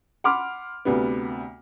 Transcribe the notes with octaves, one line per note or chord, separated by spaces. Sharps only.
F#5 B5 C6 D6 F6
D2 C3 B3